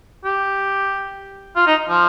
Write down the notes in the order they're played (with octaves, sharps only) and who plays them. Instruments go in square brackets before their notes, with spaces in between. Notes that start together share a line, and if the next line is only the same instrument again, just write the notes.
[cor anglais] G4
F4
D#4
F3